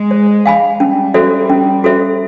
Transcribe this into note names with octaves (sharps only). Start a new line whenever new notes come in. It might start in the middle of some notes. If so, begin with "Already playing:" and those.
Already playing: G#3
C5
F5 G#5 B5
G3 C#4
F#4 A4 C5 E5
C#4
F#4 A4 C5 E5